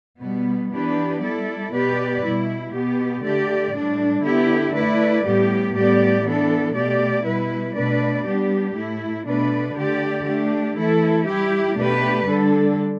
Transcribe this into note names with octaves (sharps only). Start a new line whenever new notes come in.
B2 G3 B3
E3 B3 D4 G4 B4
G3 E4 A4 D5
B2 B3 G4 B4 D5
B2 G3 E4
B2 B3 G4
D3 A3 G4 D5
A2 G3 D4
D3 B3 E4 G4
A3 E4 B4 D5
A2 G3 B3 G4
A2 G3 B3 G4 D5
E3 B3 D4 A4
B2 A3 G4 D5
B2 G3 E4 B4
B2 A3 D4 B4 D5
G3 B3 D4 G4
A2 A3 E4
B2 A3 D4 B4 D5
D3 A3 G4 D5
A3 D4 G4
E3 A3 E4 A4
G3 E4 G4
B2 A3 D4 G4 B4
D3 G3 D4 A4